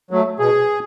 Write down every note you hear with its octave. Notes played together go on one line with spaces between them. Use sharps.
F#3 A3
B2 G#4